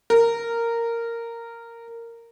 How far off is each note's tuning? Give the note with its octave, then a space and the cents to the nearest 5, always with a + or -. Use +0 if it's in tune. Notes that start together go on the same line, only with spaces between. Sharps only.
A#4 -10